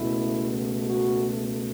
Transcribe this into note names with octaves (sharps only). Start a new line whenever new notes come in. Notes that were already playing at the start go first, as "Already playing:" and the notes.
Already playing: C#2 B2 A3 E4
F#4